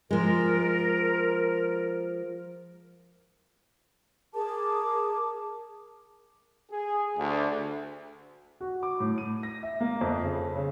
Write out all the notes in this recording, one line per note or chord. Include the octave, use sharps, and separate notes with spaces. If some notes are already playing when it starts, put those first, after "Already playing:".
F3 G#3 A#4
G#4 A#4 A5 D6
G#4
D2
F#4
D6
A2
D#7
A#6
E5
A#3
F2
C#3
C#3